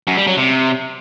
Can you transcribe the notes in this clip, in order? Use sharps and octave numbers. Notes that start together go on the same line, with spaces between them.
F#2
G3
F#3
C3